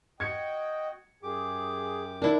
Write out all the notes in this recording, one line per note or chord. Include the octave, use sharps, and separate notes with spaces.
F#4 D#5 G5 G#6 C#7
F#2 G4 G#4 D6
D#3 D4 E4